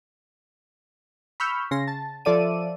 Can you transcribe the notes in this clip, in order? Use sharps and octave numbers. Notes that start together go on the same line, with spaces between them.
B5 C#6 E6 F6 G6
C#3 C6 A#6
A5
F3 A4 D5 E5 D#7